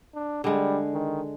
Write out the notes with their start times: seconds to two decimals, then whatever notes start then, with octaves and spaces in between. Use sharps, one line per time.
0.14 D4
0.44 D3 G3 G#3
0.93 D#3